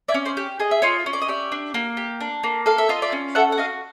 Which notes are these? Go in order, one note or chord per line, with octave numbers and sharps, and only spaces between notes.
D5 E5
C#4
C5 D5
G4
G#4 D#5
E5
F4 C#5 D#5
C#4
D5
D#5
G4 D5 E5
D4
A#3
G4
D4
A#3
A4 F5
E5
F4 D#5
D5 E5
C#4
A4 E5 F#5
F#5
F#4 D#5 F5